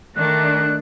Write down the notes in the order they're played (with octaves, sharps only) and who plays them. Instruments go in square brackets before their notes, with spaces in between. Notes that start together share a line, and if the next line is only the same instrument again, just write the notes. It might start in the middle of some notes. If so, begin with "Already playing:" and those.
[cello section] D#3 A3 D4 [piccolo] F#6